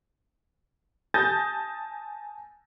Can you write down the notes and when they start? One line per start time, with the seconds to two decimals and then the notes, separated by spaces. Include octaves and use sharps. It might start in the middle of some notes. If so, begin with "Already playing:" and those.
1.14 G#5 A5 D#6 G6 A6 A#6